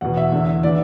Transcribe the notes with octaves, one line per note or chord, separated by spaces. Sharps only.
E2 B2 F#5
E5
E2 D3
E3 D5